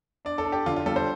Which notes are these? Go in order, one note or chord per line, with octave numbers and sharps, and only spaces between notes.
D4 D5
A4
D4
G4
D3 F4
F4
G3 A4
C5